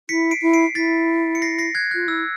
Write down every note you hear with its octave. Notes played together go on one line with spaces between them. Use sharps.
E4 B6 C#7
C7 D7
E4
C7 D7
E4 A6 B6
C#7
A#6 C7
A#6 C7
F#6 G#6
F4 F#6
E4 E6